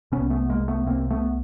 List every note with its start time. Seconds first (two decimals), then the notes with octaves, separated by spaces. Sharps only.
0.12 C2 C3 B3 C#4
0.30 A3 B3
0.49 G#3 A#3
0.68 A3 B3
0.86 C2 C3 A#3 C4
1.10 A3 B3